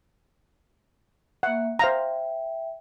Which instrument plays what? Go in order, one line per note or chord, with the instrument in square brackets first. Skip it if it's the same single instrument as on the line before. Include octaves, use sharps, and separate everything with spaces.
[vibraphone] A#3 E5 [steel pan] F#5
[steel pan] C5 F5 A#5 [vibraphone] E5 G5